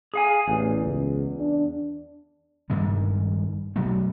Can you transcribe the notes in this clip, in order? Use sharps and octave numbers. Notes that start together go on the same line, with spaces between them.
G#4 F5 G#5
A1 E2
C#2
D4
G2 D#3 G3 G#3
B2 F#3 A3 B3